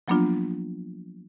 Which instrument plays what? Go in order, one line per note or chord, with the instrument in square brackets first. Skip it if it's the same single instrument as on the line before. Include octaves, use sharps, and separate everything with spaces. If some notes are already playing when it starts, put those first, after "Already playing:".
[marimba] F3 F#3 A#3 B3 D4 F4